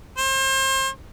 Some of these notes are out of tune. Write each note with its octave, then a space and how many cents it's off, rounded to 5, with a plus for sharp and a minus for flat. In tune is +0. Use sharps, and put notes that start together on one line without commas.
C5 +35